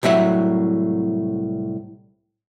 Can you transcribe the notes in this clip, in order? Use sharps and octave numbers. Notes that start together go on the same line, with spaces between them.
C2 A2 F#3 E5 F#5